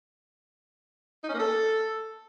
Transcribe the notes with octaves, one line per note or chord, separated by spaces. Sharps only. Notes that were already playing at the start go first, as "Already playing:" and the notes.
D#4
C#4
A#3
A4